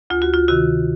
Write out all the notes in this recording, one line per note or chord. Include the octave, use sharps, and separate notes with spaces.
D2 F4
F#4
F4
C3 D#3 F#4